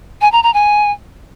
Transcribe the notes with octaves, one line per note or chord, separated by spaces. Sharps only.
G#5
A#5
A#5
G#5